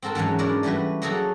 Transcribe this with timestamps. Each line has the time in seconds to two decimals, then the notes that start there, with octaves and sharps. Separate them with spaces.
0.02 C4 F#4 A4 A#4 A5
0.15 G#2 E3 F#3 C#4
0.39 C#4 D4 E4 A#4 D5
0.63 E3 G3 A3 F#4 B4
1.02 F#3 A#3 F#4 G#4 A4 A#5